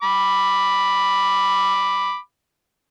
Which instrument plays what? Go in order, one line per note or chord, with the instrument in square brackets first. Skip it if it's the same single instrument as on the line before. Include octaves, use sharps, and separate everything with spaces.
[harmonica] B5 D6